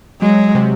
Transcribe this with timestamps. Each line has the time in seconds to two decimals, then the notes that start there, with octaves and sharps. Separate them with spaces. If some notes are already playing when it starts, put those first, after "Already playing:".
0.21 F#3 G#3
0.55 C3